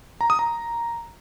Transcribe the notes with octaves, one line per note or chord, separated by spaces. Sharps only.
A#5
D#6
A#5